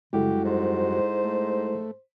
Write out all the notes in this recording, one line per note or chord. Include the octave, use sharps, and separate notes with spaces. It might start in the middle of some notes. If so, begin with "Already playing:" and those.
F#2 C#3 G3 G#3 E4 F#4 G4 A4
G#2 C5
A3